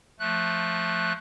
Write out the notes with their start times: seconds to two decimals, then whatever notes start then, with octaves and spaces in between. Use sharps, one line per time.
0.19 F3 A3 F#6